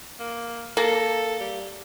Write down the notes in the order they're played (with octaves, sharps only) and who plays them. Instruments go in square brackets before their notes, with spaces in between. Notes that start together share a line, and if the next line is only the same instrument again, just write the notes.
[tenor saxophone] A#3
[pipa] A#3 [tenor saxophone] A4
[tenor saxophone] G3